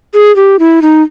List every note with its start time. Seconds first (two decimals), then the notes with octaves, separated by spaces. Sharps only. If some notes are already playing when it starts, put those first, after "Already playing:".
0.14 G#4
0.36 G4
0.59 E4
0.82 D#4